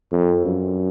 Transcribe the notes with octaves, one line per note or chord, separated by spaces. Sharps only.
F2
F#2